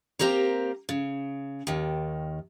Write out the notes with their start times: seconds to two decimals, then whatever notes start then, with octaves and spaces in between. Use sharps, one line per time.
0.19 A#3 C4 G4 A#4 A#5
0.89 C#3
1.67 D#2 D#3